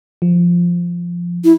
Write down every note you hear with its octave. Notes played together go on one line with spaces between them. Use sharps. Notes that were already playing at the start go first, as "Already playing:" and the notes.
F3
E4